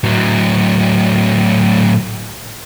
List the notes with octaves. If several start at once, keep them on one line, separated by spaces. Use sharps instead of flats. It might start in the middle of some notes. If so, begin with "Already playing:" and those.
A2 F#3